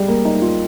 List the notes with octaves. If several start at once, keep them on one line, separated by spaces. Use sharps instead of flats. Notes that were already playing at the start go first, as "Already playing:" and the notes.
Already playing: G3 G#3
A#3
D#4
D#4
F4